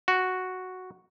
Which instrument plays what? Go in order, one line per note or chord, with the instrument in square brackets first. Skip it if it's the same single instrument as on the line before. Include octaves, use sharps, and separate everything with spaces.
[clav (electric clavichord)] F#4